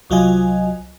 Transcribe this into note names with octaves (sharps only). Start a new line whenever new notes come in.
C2 F#3 F4 D#5 G#5